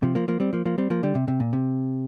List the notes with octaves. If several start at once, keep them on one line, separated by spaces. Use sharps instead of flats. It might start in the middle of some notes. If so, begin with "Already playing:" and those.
C3 F3
F3 A#3
F3 A#3
G3 C4
F3 A#3
F3 A#3
G3 C4
F3 A#3
D3 G3
C3
C3
A#2
C3